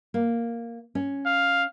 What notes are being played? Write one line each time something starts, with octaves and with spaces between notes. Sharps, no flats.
A#3
C#4
F5